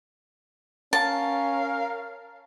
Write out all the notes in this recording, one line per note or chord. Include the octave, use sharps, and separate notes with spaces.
C#4 A#4 F5 A5